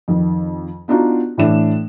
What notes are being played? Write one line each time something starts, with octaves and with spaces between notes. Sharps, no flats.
F2 D#3
B3 D4 D#4 F4 F#4
A2 E3 A3 D4 E7